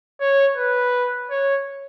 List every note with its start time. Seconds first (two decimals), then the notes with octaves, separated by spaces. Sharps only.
0.20 C#5
0.57 B4
1.30 C#5